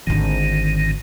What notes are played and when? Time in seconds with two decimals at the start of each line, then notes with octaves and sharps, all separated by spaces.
0.07 G#1 D3 D#3